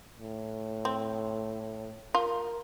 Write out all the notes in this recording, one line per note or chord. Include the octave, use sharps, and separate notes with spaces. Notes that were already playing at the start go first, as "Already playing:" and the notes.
A2
C4
F4 A#4